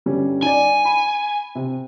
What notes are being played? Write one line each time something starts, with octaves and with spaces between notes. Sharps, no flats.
G1 G3 C#4
D#4 D5 G#5
B5
C3